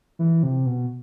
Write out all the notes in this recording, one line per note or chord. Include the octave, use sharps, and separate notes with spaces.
E3
C3
B2